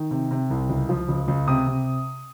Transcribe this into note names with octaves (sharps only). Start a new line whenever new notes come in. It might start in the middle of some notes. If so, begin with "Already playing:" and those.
Already playing: D#3
C3
C3
C2
C#2
F3
C#2
C#2
C3 D#6
C3